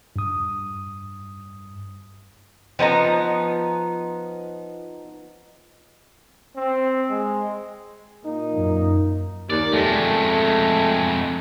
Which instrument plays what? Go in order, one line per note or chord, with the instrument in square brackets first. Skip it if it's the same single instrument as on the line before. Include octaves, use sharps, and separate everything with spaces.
[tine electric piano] G2 D#6
[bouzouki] F3 B3 D#4 A#5
[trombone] C4
G#3
[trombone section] A#2 A#3 D#4
[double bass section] F#2
[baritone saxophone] D#2 [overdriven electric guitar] D5
[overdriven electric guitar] F2 G#3 [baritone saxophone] A3